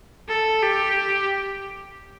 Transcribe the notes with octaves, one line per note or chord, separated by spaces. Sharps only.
A4
G4